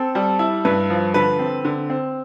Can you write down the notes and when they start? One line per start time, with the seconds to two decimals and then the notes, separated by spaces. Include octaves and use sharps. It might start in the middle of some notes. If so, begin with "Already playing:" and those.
Already playing: C4 A4
0.15 G3
0.39 E4
0.65 G2 B4
0.90 F3
1.14 D3 B4
1.39 C4
1.65 D3
1.90 C4